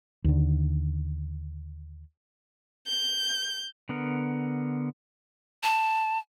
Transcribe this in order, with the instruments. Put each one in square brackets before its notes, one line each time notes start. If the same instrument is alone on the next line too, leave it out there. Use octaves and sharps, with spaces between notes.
[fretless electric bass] D#2 D3
[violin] G6
[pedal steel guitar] D3 B3 A#4
[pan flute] A5